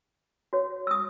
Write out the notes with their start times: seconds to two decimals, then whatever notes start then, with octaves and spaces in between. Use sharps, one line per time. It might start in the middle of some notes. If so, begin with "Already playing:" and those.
0.53 F#4 C#5
0.87 E6
0.91 D#6